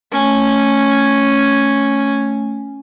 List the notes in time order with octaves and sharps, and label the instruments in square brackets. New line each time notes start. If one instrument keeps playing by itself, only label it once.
[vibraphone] A3 G#5 [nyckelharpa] C#4